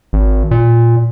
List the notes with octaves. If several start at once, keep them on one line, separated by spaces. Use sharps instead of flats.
G#1
A#2